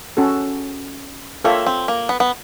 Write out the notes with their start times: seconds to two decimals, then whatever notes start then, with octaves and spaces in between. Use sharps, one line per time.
0.17 C#4 F#4 A4
1.44 A#3 F4 A4 C#5 E5 G5
1.66 C4
1.88 A#3
2.09 B3
2.20 B3